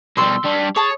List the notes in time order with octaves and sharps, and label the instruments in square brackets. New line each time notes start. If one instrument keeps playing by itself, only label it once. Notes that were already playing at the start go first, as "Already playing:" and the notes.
[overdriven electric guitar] B2 G3 [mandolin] C6 E6 F6
[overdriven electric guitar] G3 D4
[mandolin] G#4 A5 [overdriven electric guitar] C#5